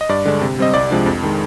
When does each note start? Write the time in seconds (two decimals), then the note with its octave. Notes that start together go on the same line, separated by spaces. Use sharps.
0.01 D#5
0.09 G2 D5
0.25 D3 G#3 D4
0.41 C3
0.59 G3 C4 D#5
0.74 C2 D5
0.91 C3 F3 G#3 D4
1.06 F2
1.23 D#3 G#3